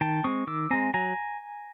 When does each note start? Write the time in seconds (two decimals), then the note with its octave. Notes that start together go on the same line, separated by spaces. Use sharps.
0.01 D#3 G5 A5
0.24 G#3 C4 C#6 D#6
0.47 D#3 D6 E6
0.71 G#3 C4 G#5 A#5
0.94 F#3 G#5 A#5